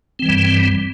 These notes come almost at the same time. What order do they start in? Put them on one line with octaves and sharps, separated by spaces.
C4 E3 G3 G2